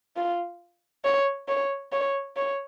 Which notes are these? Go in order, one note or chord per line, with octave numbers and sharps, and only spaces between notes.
F4
C#5
C#5
C#5
C#5